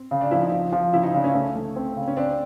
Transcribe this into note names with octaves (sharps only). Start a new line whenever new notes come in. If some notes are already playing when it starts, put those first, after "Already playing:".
Already playing: C4
C#3
D4
F3 E4
D#4
F3
F3
C#3 E4
D#4
C#3 D4
C#4
A3 C#4
A3
C4
C#3
C#4
C4 D4